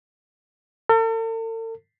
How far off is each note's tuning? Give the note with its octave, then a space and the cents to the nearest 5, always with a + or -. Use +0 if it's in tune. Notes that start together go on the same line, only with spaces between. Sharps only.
A4 +45